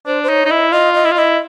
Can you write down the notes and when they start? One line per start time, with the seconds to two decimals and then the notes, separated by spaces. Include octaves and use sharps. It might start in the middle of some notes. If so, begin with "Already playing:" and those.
0.06 D4 C5
0.23 C5
0.29 D#4 C#5
0.46 D#4
0.50 E4 D#5
0.72 F4 D#5
0.94 D#5
1.05 E4
1.11 F4
1.16 E4 D#5